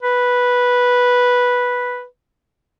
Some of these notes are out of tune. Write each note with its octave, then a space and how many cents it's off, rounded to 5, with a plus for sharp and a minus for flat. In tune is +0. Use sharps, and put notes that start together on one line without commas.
B4 -5